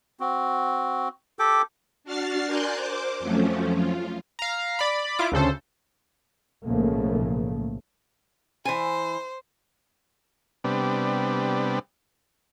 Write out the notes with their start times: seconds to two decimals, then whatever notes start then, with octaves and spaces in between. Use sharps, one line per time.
0.20 C4 F#4
1.39 G4 A4 G5 D6
2.04 D4 F#4 F6 A6 C7
2.47 A#4 D5 G#5 C6 F#6 G6
2.76 C5 D6
3.20 F2 F3 F#3 A3 C#4
3.73 F4
4.39 F5 A#5
4.79 D5 B5
5.19 E4 F4 D6
5.32 D2 C#3 A4 C5
6.65 B1 A2 C#3 F3 A3 A#3
8.65 E3 C5 G#5
10.64 C3 G3 B3 D4